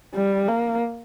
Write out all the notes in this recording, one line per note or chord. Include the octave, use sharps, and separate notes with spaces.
G3
A#3